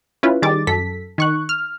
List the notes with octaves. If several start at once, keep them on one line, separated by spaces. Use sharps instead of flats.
C#4 E4 F4 B4
D#3 G3 G#4 D6 A6
F#2 A4 B6
D#3 C#6 F#6
F6